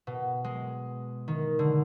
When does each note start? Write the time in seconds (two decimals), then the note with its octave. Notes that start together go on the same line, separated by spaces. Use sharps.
0.07 B2
0.44 G#3
1.28 D#3
1.59 D3